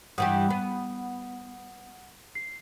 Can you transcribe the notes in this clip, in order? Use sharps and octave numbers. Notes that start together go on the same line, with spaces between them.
G2 E3 G4 F#5 D#6
B3
C7